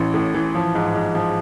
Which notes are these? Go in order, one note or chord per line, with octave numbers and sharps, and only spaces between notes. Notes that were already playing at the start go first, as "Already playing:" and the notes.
Already playing: A1 E3
A2
E3
F3
G#2
G#2
F3